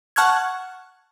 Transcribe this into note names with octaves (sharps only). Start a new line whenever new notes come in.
F#5 A5 C#6 F6 F#6 G#6